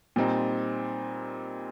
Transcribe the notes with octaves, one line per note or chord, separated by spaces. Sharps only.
A#2 G3 C4 D#4